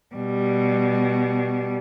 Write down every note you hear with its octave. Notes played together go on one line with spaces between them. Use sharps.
B2 G3